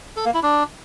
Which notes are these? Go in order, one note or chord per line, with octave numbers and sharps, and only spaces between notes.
A4
A#3
E4
D4